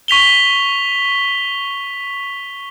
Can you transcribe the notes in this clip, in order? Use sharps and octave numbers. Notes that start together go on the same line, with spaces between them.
C#6 B6 F7 G7